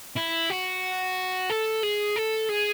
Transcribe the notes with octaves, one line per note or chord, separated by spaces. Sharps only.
E4
F#4
A4
G#4
A4
G#4